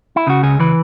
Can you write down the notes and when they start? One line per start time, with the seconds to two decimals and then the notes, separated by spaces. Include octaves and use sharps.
0.16 E4
0.27 C#3 F#4
0.43 C#2 G#4
0.60 E3 B4